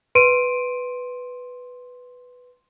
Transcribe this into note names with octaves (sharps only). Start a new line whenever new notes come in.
B4 C6 D7 D#7